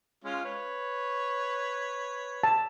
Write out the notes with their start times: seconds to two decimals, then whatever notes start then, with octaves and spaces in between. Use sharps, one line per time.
0.24 G#3 C#4 F4
0.45 B4 C#5
2.43 A5